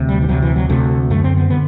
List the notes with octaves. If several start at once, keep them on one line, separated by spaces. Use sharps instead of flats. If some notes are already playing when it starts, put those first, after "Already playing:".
Already playing: D2 C3
G3
E3
D2 C3 F#3
E3
F#3
D2 C3 A3
F#2 D3 A3
C4
B3
D3 B3